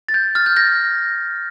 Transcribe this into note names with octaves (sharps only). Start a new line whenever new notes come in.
A6
G6
F6 A6
G6
G6 A#6